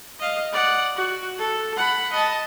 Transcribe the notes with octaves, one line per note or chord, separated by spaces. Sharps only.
D#5 F5
D5 F#5
F#4
A4
F#5 B5
D#5 A5